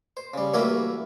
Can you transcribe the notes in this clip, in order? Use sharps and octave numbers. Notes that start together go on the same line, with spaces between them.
C5
C#3 G3
E3 F#3 A3 A#3 G4 A#4